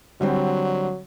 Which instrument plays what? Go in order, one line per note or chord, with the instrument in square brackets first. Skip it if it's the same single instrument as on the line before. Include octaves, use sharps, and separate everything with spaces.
[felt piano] D3 G3 C4 [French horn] F#3